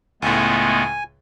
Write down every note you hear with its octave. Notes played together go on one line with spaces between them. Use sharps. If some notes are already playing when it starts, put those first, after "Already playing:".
C#2 A2 G#3 A3 B3 G#5